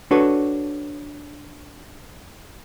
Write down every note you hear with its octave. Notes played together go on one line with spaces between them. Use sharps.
D4 F#4 A4 B4 C#5